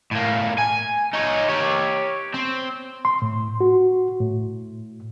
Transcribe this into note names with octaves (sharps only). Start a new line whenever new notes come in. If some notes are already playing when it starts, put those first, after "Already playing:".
A2 A#3
G#5
D#4 C#5
G4 C#5
C4
C6
A2
F#4
A2